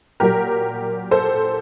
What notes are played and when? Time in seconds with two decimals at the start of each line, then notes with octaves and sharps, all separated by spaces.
0.20 A#2 F#3 G4 A#4
1.11 A4 C5